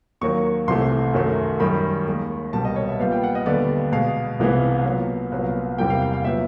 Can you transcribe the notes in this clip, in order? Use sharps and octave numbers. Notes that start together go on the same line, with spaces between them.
D#2 D#3 F#3 A#3 C#6
C2 C3 E3 A3 C6
F#2 D#3 F#3 A3
F#2 D#3 G3 B5
D#2 D#3 G#3
C2 B2 G3 A#3 A5
D#5
C#5
E5
A#2 G3 B3 F5
G5
F#5
D#5
D#2 D3 G3 B3 D5
B2 G#3 B3 F5
C2 C3 E3 G#3 B3
A#2 F#3 B3
C2 A#2 F#3 B3
E2 C3 E3 G3 A#3 G5
F5
F5
F5
A#2 F#3 B3 E5